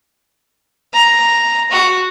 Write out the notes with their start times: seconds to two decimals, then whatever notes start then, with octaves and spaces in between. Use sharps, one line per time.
0.93 A#5
1.71 F#4